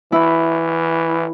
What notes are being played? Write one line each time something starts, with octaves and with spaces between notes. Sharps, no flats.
E3 E4